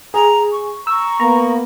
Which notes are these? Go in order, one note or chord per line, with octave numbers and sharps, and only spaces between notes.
G#4 A#5
C#6
A#5 C#6 E6
A#3 B3 A#5